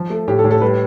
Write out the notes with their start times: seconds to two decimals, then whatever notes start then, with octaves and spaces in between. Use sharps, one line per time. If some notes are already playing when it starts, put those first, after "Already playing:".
Already playing: F3
0.10 A3
0.28 A2 G4
0.39 A4
0.44 A2
0.51 A4
0.62 G3 B4